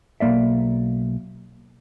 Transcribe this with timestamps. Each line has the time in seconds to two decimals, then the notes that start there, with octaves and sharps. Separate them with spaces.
0.20 B1 C3 A#3 D5 E5